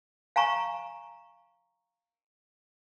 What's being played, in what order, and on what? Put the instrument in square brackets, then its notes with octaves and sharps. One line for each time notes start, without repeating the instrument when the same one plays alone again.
[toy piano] F5 G#5 A#5 C#6